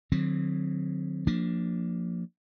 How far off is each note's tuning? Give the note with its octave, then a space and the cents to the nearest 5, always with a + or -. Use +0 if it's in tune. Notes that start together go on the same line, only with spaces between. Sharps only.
D3 +40 F#3 -20 C4 +0
F3 +15 A#3 -15 D4 +0